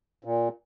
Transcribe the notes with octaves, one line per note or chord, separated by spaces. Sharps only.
A#2